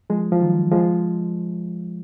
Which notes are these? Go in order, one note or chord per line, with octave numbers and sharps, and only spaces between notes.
F3 G#3
F3
D#3 F#3
F3 G#3